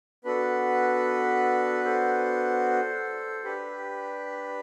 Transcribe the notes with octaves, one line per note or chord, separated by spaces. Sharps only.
B3 D4 F#4 A4 B4
A4 C5
D4 G4 B4